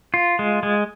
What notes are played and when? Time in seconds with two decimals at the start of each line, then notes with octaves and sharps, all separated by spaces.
0.14 F4
0.39 G#3
0.63 G#3